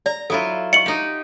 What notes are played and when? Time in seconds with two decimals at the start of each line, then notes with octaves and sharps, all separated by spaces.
0.06 D5 A#5
0.30 F#3 E4 F4 A4
0.73 D#5 C#6 C#7 F#7
0.86 D#4 G4